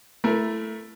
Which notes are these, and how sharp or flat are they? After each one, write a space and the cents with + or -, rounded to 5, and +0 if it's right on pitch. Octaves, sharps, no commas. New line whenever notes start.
A3 +0 E4 +15 A#4 +30